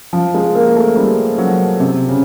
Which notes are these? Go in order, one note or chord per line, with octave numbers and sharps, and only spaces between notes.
F3
G#3
A#3
A3
G3
F#3
C3
C#3